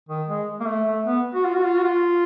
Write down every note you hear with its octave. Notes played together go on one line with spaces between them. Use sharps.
D#3
G#3
A#3
A3
A3
B3
F#4
F4
F#4
F4
F#4
F4